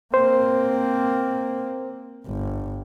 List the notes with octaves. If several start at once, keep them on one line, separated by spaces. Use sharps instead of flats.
A#3 C4 C5
G1